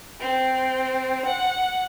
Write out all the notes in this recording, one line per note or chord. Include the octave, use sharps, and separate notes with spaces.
C4
F#5